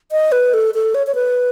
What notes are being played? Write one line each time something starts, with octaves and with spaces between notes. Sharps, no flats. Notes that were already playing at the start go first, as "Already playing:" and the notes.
D#5
B4
A4
A4
C#5
C#5
B4